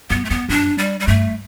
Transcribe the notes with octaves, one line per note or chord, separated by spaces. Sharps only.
F#2 B3
A3
E2 B3
F#2 D4
G3
G3
G2 A3